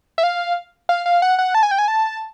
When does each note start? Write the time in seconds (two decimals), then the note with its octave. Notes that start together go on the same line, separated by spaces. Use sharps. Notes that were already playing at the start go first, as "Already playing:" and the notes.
0.18 E5
0.23 F5
0.89 F5
1.06 F5
1.22 F#5
1.39 F#5
1.55 A5
1.63 G#5
1.71 G5
1.78 G#5
1.88 A5